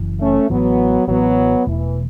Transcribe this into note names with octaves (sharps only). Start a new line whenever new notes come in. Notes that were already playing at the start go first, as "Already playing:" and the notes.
Already playing: F#1 F#2 E3
A3 C#4
A1 A2 E3 F#3 B3
A1 A2 E3 F#3 B3
E1 E2 B2 E3 A3